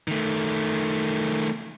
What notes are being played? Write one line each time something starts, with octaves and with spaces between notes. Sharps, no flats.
D#3 A3